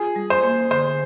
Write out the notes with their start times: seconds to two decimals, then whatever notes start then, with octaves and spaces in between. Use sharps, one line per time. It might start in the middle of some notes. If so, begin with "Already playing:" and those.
Already playing: F4 G#4
0.16 G3
0.30 C5
0.43 A#3
0.71 D3 C5